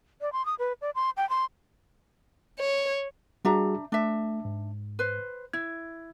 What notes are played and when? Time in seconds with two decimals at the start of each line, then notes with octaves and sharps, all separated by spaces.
0.21 D5
0.32 C6
0.46 D#6
0.59 B4
0.81 D5
0.95 C6
1.17 G5
1.29 C6
2.59 C#5
3.45 G3 D4 F#4 G#4 E5 A#5
3.92 A3 D4 E5
4.45 G#2
4.99 B4 C5
5.53 E4 G#6